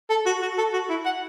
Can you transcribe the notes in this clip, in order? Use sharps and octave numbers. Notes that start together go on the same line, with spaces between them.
A4
F#4
F#4
A4
F#4
E4
F#5